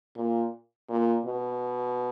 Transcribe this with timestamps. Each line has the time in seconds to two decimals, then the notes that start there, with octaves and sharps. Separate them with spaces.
0.16 A#2
0.89 A#2
1.26 B2